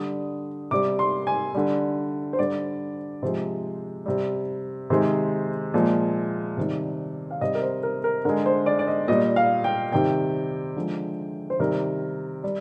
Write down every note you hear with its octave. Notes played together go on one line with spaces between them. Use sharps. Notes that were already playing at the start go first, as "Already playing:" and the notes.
Already playing: D3 G3 D#6
C3 G3 D6
C6
G#5
D3 G3
C5
D3 G3 D5
C3 F3 G#3 C5
C3 G3
C3 D#3 G#3 C5
A#2 F3 G#3
C3 D#3 G3
F5
C3 G3 D#5
A#4
C5
A#4
A#4
D3 G#3 A#4
C5
D5
D5
D#5
A#2 G3 D#5
F5
G5
C3 D#3 G3 G5
D3 F3 G#3
C5
C3 D#3 G3 A#4
G3